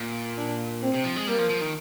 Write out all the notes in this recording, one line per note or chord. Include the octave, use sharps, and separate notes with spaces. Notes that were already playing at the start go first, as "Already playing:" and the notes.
Already playing: A#2
D4
C4
C3
F3
G#3
G3 A#3
F3
F3
D#3